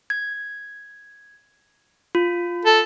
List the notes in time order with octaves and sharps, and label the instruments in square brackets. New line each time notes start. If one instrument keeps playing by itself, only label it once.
[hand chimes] G#6
F4
[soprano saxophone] A4